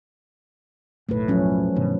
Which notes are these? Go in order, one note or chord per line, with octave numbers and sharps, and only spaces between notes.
F#1 B1 A2 A3 B4
F3 F#3 C#4
G2 B2 D#3